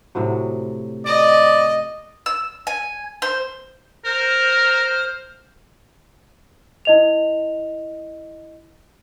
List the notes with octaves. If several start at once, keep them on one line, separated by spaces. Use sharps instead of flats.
A2 C3 F#3
D5 D#5
E6
G#5
C5
A#4 C5 F6
E4 D#5 F7